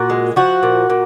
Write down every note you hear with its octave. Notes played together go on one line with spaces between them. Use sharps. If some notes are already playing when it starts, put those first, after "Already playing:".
Already playing: A#2 F#4
G#3
F3 F#4
A#2
A#2